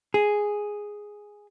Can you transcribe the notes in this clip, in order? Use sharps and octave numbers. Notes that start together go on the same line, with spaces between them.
G#4